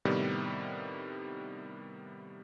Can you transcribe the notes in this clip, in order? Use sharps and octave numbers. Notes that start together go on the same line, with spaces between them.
A2 C3 D#3 G3 B3